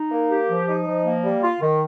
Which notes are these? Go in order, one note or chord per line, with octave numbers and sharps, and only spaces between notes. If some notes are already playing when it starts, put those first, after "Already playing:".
Already playing: D#4
A#3
G4
F3
D#4
F3
A#3
G3
F4
D#3